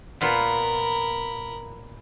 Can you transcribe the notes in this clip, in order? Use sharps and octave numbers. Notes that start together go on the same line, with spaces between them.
A#2 B3 F4 A#4 B5